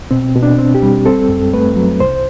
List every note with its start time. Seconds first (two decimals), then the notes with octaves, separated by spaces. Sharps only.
0.11 B2 C4
0.35 B2
0.43 D4
0.58 C4
0.75 G4
0.82 G3
1.06 C4 A4
1.29 F#2
1.53 A3 B4
1.76 F#3
2.00 C2 C5